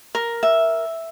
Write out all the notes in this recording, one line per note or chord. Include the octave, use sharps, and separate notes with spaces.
A#4
E5